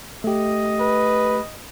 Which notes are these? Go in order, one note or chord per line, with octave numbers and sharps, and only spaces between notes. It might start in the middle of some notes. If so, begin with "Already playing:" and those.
A3 G4 D#5
B4